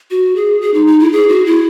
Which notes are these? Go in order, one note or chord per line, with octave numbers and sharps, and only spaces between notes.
F#4
G#4
G#4
D#4
D#4
E4
G#4
F#4
E4